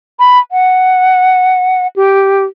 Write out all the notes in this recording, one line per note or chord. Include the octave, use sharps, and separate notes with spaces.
B5
F#5
G4